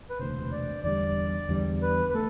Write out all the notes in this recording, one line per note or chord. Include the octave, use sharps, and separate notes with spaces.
B4
E1 D2 C3 C5
D5
E2 D3 G3 D5
E2 D3 G3
B4
B4
A3 A4